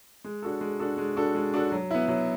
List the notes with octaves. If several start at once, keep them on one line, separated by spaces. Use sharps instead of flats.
G#3
D4 F#4 A4
G#3
D4 F#4 A4
G#3
D4 F#4 A4
G#3
D4 F#4 A4
F#3
B3 E4
F#3